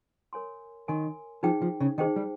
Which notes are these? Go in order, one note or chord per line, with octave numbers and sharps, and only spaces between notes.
A#4 C#5 G#5 C6
D#3 A#4 C#5 G#5 C6
F3 D#4 G#4 C5 G5
F3
C#3
D#3 D#4 G#4 C5 G5
G3